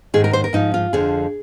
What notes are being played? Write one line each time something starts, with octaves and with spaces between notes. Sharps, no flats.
G#2 D#3 G#4
A#4
C5
A#4
G#2 F3 D#4
F4
F2 D3 F3 G#4